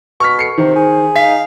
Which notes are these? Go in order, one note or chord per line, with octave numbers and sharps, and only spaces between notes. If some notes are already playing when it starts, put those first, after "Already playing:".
B2 C#6 F6 B6
A4 C7 C#7
C3 D#3 C5
G#4
D#4 F5 B6